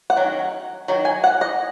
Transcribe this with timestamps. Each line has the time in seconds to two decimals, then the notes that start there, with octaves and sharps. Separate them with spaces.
0.10 F#5
0.17 D#3 F#3 C#4
0.88 D#3 F#3
1.05 G#5
1.24 F#5
1.41 D#5